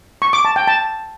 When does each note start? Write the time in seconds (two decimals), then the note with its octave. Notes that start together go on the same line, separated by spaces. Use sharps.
0.22 C#6
0.33 D6
0.45 A5
0.56 G5
0.68 A5